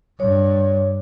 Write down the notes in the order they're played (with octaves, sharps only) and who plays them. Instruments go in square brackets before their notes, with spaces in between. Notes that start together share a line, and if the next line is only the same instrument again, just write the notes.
[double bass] G2 [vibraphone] C#5